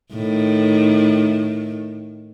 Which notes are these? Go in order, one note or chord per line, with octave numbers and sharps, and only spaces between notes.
A2 D#3